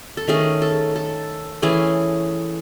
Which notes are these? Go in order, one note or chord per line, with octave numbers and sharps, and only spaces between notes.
A4
D#3 A3 C#4 G#4
A4
A4
E3 A3 C#4 G#4